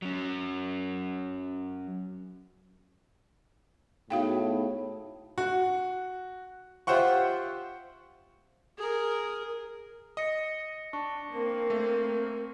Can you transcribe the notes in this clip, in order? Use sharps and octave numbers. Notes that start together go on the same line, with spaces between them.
F#3 C#4
A2 B3 D#4 F#4 G#4 F5 G5
F#4
F4 G4 C5 E5 F#5 C#6
G#4 A#4
D#5 A#6 C#7
D4 A5 C#6
A#3 C4 A#4
A3